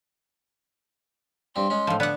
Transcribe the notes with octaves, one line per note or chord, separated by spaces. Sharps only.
G2 C4 C6
G#3 C#4
A2 F3
D3 B3 F#5 F#6